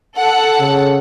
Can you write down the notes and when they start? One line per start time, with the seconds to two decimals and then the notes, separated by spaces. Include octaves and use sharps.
0.16 A4 F#5
0.60 C#3